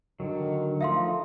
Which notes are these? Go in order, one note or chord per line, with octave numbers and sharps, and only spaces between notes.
D3 D#3 F#3
F3 A3 D#4 E5 F5 C6